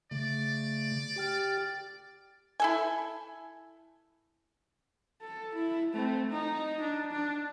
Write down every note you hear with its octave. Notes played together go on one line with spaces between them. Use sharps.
C#3 A3 D5
G4 G5 F6
E4 A4 G#5
A4
E4
A3 C4
D#4
D4
D4